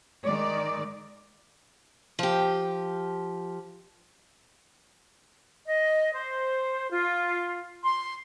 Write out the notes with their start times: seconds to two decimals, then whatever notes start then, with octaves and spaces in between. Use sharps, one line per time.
0.25 D#3 G#3 D5
2.19 F3 G4
5.65 D#5
6.12 C5
6.91 F4
7.83 C6